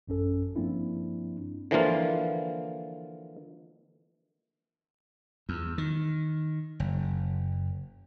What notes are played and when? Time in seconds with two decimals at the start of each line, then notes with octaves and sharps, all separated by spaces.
0.08 A1 F#2 C#4 A4
0.56 G2 F3 A#3 C4 D4 E4
1.71 D3 E3 F3 A#3 F4
5.49 E2
5.78 D#3
6.80 F#1